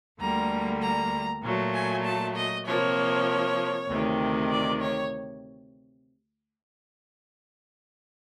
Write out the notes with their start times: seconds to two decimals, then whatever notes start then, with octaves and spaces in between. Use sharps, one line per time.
0.20 D2 D3 G3 A#3 A#5
0.82 A#5
1.43 A#2 F#3 A3
1.74 G#5
2.05 A5
2.36 D#5
2.66 C3 F3 A#3 C#5
3.89 D2 C3 D#3
4.51 D5
4.81 C#5